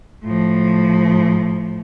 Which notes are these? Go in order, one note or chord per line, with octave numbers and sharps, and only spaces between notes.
A2 F3